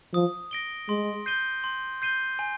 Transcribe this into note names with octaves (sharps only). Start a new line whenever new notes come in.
F3 D#6
A#6 D7 G7
G#3 C6
G6 C7 D#7 G7
C6
G6 C7 D#7 G7
G#5